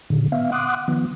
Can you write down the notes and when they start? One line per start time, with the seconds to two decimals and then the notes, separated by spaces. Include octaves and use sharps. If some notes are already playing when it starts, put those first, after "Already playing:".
0.10 A#2 D3 D#3
0.32 B3 E5 F5
0.52 F#5 C6 D6 D#6 F#6
0.88 D#3 F3 B3